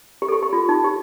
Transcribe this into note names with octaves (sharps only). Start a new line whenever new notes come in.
G4
A4
G4
G4
F4
D#4
G4